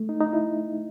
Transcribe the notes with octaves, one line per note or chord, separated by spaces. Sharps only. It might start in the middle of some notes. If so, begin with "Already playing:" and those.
Already playing: A3
D#4
D#4
E4